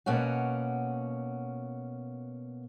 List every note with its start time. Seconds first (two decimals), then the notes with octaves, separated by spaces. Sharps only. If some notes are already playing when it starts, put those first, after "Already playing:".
0.06 B2 A#3 C#4 F#4